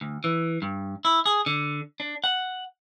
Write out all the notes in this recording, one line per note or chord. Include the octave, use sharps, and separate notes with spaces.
D2
E3
G2
E4
G#4
D3
D4
F#5